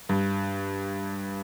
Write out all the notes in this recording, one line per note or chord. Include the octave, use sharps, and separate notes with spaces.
G2